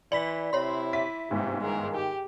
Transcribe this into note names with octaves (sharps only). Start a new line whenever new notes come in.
E3 D5 B5 B6 F#7
C3 E4 C#5 C6
E5 B6
G1 G#2 C3
D#3 G#3 A#4
G4 G5